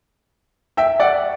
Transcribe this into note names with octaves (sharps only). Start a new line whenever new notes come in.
E5 G5
D5 F#5